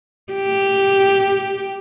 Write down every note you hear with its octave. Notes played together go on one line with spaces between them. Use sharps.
G4